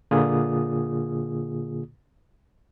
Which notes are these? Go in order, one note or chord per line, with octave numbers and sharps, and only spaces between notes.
A#2 D3 A#3 F4 G#4 D#6